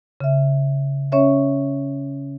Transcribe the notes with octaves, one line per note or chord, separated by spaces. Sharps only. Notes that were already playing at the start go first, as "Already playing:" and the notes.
C#3 E5
C#4 C#5 E5